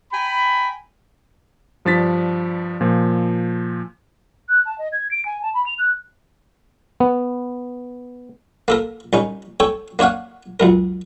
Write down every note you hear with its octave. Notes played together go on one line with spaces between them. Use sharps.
G5 G#5 A#5 B5
G2 F3 D4 A6 B6
A#2 F3
F#6
A5
D#5
G#6
D7
G#5
A5
B5
F7
F#6
B3
A#3 A4 A#4
C2 C#4 D#4
A4 C#5 G5
A#3 D4 C#5 F5 F#5
C#2 F#2 A#4